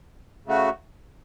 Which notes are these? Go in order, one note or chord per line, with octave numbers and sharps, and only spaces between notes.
C#3 A3 F#4